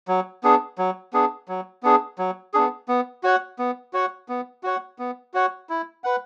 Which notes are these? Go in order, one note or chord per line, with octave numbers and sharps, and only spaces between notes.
F#3
B3 D4 G#4
F#3
B3 D4 G#4
F#3
B3 D4 G#4
F#3
B3 D4 G#4
B3
F#4 C#5 F#5
B3
F#4 C#5 F#5
B3
F#4 C#5 F#5
B3
F#4 C#5 F#5
E4
B4 F#5